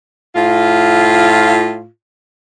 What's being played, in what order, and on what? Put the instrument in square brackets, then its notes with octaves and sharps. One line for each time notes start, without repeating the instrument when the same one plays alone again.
[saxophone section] A2 F4